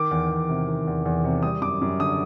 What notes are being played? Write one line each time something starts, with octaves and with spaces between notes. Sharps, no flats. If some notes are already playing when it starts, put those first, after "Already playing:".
Already playing: D#3 D6
E2
E2
C3
D#3
E2
E2
C3
G3 D#6
F#2 D6
F#2
D3 D#6